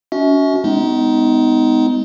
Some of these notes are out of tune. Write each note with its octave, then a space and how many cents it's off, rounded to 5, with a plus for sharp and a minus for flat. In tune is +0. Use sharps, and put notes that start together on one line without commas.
C#4 +40 F#4 +5 E5 -35
G#3 +0 B3 +40 D#4 +10